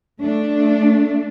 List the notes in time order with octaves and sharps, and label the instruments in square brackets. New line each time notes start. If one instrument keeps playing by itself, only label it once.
[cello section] A3 D4